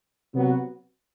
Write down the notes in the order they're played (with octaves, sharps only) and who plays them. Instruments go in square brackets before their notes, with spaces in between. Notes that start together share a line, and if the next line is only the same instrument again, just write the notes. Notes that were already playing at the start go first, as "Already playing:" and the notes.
[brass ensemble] C3 F#3 B3 F#4